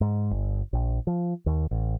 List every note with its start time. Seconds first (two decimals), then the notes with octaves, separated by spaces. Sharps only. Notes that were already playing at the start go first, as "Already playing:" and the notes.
0.01 G#2
0.31 G1
0.73 A#1
1.07 F3
1.46 D#2
1.71 A1